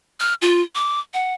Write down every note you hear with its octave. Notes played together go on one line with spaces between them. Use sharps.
F6
F4
D6
F#5